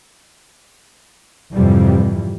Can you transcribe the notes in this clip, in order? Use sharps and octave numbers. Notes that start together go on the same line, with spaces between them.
F2 G#2 C3 E3 G3